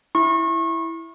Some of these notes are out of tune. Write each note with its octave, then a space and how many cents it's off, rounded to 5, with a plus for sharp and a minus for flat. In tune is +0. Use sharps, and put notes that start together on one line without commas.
E4 +0 C#6 -30